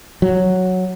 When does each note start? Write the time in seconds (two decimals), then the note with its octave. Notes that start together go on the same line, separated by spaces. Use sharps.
0.22 F#3